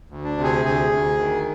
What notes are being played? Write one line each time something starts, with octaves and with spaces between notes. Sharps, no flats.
D2
D4
C3
G#4
D2 G#4
D2
D#3